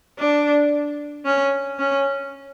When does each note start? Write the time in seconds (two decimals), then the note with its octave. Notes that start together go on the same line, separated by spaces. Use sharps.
0.18 D4
1.25 C#4
1.79 C#4